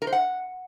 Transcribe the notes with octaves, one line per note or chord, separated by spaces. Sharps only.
A#4
C5
F#5